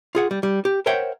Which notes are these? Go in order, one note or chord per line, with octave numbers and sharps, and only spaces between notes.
F4 G#4 F#5
G3
G3
G4
A#4 C5 C#5 E5 F#5 G5